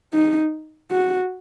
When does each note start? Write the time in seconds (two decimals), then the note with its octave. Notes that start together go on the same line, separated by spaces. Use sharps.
0.13 D#4
0.91 F#4